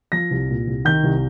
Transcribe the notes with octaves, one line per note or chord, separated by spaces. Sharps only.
F3 A#6
C2
A#2
C2
D#3 G6
C2